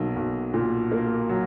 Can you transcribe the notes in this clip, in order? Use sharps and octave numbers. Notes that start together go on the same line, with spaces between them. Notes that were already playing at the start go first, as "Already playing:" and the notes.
Already playing: B1 F#3 A#3
B1
A#2
A#3
F#3